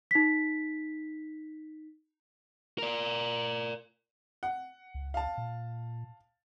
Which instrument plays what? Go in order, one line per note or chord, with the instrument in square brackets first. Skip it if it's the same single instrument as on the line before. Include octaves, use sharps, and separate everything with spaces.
[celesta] D#4 B6
[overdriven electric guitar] A#4 D5
[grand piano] F#5
[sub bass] C#2
[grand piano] F5 A5
[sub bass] A#2